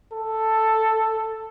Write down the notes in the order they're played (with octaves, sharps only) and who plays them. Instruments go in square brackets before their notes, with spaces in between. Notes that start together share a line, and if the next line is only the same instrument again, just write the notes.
[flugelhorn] A4